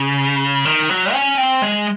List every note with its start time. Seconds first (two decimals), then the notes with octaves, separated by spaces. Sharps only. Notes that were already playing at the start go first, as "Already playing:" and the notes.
Already playing: C#3
0.65 D#3
0.89 F#3
1.13 C#4
1.37 C4
1.62 G#3